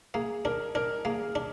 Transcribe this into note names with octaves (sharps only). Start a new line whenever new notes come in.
A#3 G#4
D4 A#4
D4 A#4
A#3 G#4
D4